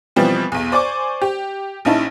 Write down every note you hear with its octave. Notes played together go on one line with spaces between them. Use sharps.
B2 E3 F3 G3 C4
B1 E2
C5 D5 G#5 C#6 D6
G4
A#1 C#4 D#4 E4 A5